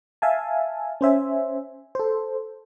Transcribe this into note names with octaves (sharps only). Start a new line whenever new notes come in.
E5 F5 G#5 A5
C#4 C5 E5 G#5
A4 C5